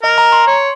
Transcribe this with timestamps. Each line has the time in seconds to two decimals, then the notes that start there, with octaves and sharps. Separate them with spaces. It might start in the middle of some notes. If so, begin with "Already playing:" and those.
0.03 A#4 D#5
0.18 A#5
0.32 C6
0.47 C#5